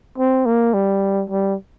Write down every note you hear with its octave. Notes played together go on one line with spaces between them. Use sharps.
C4
A#3
G3
G3